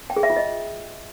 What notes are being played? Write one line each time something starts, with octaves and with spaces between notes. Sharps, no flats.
G5
G#4
E5
F4
D#5